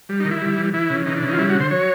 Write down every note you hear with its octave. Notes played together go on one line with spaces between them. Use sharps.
G3
D#4
D#3
E4
G3
E3
E3 E4
C#3
E3 D#4
D4
C#3
D#4
F4
G3 E4
F#4
D3
C5
F#3 C#5